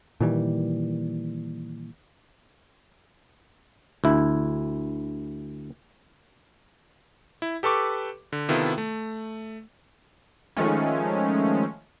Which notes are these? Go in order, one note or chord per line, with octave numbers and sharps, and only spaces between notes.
A#2 D#3 E3 G3
D2 E4
E4
G4 A4 B4 C#6 D6
D3
C3 D#3 B3 E4 F4 A4
A3
D#3 F3 G#3 A3 C#4